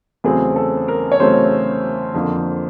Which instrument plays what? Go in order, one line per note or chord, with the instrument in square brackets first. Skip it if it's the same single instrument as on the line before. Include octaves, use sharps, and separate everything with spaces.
[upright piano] E2 C#3 F#3 A3 C4 G#4
A4
A#4
C#5
E2 C#3 F#3 A3 C4 C5
F2 D3 F3 A#3